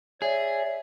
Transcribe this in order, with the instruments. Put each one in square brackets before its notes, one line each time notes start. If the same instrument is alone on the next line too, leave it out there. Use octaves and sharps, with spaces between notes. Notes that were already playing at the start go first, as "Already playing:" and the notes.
[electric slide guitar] G#4 [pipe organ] C#5 D5 [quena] E5